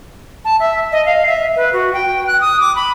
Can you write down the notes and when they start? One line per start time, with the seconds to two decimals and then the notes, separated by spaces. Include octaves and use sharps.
0.45 A5
0.60 E5
0.92 D#5
1.06 F5
1.27 E5
1.56 B4
1.73 F#4
1.93 G5
2.27 F#6
2.41 D#6
2.60 D6
2.76 B5